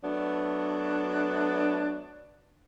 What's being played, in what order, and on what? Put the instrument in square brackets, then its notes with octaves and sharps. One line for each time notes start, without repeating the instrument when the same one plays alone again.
[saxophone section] F#3 A3 B3 D4